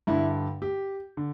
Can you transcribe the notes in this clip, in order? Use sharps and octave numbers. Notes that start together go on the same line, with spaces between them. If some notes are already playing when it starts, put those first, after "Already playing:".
G2 D3 E4
G4
D3